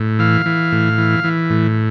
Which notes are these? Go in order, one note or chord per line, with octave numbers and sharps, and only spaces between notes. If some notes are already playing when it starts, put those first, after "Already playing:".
Already playing: A2
E3 F5
E3
A2
E3
E3
A2